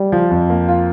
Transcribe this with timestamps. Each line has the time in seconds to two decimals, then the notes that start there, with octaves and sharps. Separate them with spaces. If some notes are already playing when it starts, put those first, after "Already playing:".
Already playing: G3
0.12 F3
0.31 F2
0.50 A#3
0.68 F4